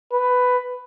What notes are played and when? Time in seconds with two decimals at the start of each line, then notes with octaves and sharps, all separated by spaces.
0.13 B4